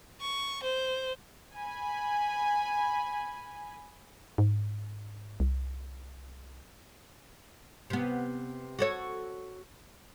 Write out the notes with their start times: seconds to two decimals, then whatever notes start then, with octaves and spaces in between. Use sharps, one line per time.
0.21 C#6
0.63 C5
1.55 G#5 B5
4.38 G#2
5.40 C2
7.90 C3 B3
8.79 F#4 A4 C#5